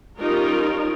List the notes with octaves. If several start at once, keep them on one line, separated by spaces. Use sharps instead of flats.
G3 C#4 D#4 F4 A#4